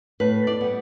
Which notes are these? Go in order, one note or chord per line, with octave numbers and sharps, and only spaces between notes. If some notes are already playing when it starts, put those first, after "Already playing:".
A2 B4
D5
G3 B3